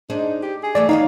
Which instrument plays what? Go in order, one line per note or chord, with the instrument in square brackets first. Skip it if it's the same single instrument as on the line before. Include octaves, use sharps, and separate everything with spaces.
[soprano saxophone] D4 [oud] D#4 G#4 C5
[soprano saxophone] G4
G#4
[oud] E3 A3 A4 [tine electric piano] D5
[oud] D#3 B3 C#5 [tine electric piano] D#4 [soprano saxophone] F5